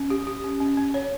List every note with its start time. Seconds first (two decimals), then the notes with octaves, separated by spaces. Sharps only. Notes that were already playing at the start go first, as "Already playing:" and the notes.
Already playing: C#4
0.10 G4
0.27 G4
0.44 C#4
0.60 C#4
0.77 C#4
0.94 C#5